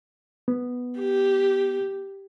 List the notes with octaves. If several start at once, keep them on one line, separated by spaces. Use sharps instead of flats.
B3
G4